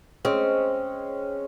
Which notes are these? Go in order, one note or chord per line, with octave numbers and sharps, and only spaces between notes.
G#3 C4 C#4